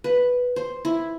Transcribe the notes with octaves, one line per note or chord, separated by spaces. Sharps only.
B4
C5
E4